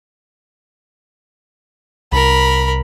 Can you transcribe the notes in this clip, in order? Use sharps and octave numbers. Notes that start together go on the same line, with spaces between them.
C2 A#4 B5